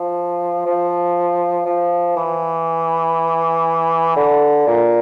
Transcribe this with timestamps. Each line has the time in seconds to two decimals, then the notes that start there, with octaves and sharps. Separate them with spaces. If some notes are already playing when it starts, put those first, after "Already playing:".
Already playing: F3
0.65 F3
1.66 F3
2.16 E3
4.16 D3
4.67 A#2